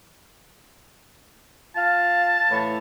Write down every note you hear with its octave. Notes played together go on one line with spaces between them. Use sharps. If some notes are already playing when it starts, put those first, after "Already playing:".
F4 F5 A5
A2 E3 C#5